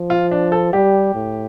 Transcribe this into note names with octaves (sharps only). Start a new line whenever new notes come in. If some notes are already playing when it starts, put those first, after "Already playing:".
Already playing: F3
F4
D4
A4
G3 G4
A2